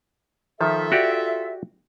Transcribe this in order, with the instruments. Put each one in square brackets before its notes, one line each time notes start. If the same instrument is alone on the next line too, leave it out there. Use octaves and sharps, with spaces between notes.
[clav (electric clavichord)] D#3 F3 [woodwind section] F4 A4 E5
[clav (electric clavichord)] F#4 G4 D5